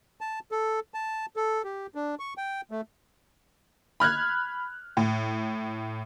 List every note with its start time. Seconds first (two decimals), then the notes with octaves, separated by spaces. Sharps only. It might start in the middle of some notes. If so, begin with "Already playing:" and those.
0.21 A5
0.52 A4
0.94 A5
1.36 A4
1.64 G4
1.95 D4
2.19 C#6
2.37 G5
2.71 A3
4.00 B5 F6 F#6 G#6
4.97 A2